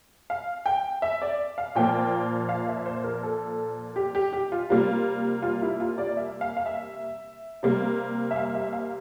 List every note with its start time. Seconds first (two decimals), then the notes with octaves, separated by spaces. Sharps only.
0.30 F5
0.66 G5
1.02 E5
1.22 D5
1.58 F5
1.75 A#2 F3 A#3 G5
2.49 F5
2.68 E5
2.86 C5
3.04 A#4
3.23 A4
3.96 G4
4.15 G4
4.33 G4
4.52 F4
4.70 C3 G3 A#3 F4
5.42 F4
5.62 E4
5.80 F4
5.98 D5
6.17 E5
6.41 F5
6.57 F5
6.66 E5
7.63 C3 G3 A#3
8.31 E5
8.36 F5
8.55 E5
8.73 F5